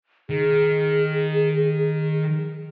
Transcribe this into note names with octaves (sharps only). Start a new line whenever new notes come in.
D#3 G#4